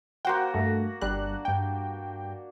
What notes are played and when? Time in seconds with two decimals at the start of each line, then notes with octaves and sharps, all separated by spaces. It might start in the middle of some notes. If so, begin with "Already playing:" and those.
0.25 A#3 F#4 C5 F#5 G5
0.54 G2 A3
1.01 G1 G3 D4 F#6
1.45 G2 G5